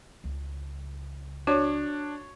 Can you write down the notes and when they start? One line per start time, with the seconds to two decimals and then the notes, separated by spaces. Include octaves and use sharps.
0.24 C#2
1.47 D4 F#4 C#5